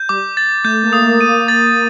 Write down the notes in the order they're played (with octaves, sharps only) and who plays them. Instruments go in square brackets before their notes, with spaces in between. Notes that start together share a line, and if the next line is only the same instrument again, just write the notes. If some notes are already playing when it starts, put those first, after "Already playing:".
Already playing: [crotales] G6
[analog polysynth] G3 [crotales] D6
[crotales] A6
[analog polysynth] A3 [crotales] G6
[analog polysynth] A#3
[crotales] D#6
[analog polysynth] A#3
[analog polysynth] A#3 [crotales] D#7
[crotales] A6